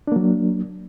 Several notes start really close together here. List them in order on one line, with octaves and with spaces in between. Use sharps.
D4 A#3 F#3